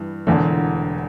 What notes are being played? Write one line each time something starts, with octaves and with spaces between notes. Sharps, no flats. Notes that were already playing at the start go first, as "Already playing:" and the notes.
Already playing: G2 E3
E1 E2 D3